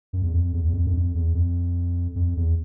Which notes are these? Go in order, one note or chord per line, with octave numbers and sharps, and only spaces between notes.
F#2
E2
F2
E2
E2
F2
F#2
F2
E2
F2
F2
E2